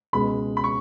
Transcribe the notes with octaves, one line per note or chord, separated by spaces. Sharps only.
C#2 B2 G#3 B5
B5
C#6